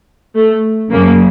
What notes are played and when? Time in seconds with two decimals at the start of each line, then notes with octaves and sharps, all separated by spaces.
0.36 A3
0.91 F#2 C#3 F#3 A#3